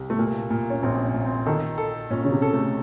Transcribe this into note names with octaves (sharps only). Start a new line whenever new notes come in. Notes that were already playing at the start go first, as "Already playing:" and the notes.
Already playing: C2
A3
A#2 A#3
A#2
C#4
A#1 C4
C#4
A#2
C4
D#3 A4
A4
A#2 C#4
C#3
C3
A4
A3